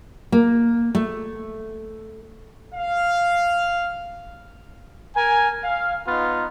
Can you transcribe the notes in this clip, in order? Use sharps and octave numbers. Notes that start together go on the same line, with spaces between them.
A#3
A3
F5
A#4 G#5
F5
B3 D#4 F4